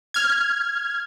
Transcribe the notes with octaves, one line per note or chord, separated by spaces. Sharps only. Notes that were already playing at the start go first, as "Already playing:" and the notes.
F6 G#6